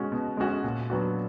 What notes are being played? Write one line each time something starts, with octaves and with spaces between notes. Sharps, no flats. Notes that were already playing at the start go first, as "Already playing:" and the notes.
Already playing: B2 G#3 C#4 F#4
B2
G#3 C#4 F#4
A#2
F#3 B3 D4 F#4